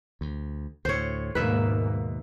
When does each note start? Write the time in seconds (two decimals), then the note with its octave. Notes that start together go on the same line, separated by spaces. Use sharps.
0.21 D2
0.85 D2 A2 C5 C#5
1.35 D#2 G#2 B2 A#3 B4 E5